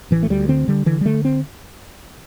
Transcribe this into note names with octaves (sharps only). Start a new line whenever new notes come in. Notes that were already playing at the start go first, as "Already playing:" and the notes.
A1 E3
A3
D2 G3
D3 C4
D3 G3
D3 E3
G3
D3 A3
C4